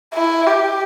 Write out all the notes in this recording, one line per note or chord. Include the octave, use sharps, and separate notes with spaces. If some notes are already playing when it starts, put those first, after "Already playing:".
E4
G4